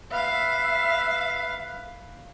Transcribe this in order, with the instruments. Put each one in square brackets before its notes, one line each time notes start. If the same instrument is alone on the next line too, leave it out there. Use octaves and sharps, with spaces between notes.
[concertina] B4 [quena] E5 [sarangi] F5